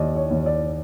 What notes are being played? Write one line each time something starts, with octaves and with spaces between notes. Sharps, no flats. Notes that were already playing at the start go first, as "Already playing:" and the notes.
Already playing: D#2 D5 D#5
C#5
D#2
D5